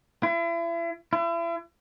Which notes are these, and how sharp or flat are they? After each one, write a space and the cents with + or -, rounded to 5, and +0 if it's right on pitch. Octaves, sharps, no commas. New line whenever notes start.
E4 +40
E4 +40